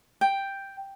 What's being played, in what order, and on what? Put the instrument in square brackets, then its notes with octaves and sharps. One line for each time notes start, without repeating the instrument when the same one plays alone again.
[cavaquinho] G5